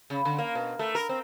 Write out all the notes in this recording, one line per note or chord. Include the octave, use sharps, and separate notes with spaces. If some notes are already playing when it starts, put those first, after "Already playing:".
C#3
D3
A#3
B2
A3
A#4
C4